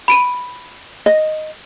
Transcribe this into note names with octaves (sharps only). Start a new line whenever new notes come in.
B5 D7 D#7
D#5